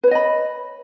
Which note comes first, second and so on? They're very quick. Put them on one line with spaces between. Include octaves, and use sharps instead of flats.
B4 C#5 D#5 B5